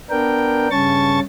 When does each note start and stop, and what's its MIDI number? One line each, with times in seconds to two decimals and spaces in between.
0.10 0.68 59
0.10 0.68 62
0.10 0.68 70
0.10 0.68 79
0.71 1.20 43
0.71 1.20 49
0.71 1.20 61
0.71 1.20 81
0.71 1.20 85
0.71 1.20 93